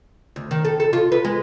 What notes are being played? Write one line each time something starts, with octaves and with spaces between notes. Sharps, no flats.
D2
D#3
A4
A4
F4
B4
G#3